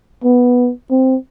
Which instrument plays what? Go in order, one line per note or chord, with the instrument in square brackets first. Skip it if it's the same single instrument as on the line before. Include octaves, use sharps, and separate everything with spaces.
[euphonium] B3
C4